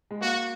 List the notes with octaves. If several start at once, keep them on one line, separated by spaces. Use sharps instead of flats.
G#3
A#3 F#4